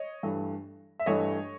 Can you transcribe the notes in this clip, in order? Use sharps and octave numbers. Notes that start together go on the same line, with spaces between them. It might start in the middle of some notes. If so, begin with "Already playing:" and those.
Already playing: C#5 D#5
G2 E3 A3
E5
G2 E3 A3 C#5 D#5